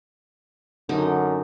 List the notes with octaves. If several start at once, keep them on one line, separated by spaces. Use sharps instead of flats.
F#2 D3 D#4 D#5